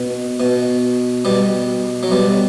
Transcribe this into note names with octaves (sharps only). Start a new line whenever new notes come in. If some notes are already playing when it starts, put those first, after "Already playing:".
Already playing: B2
B2
B2 G3
F#3
B2 G3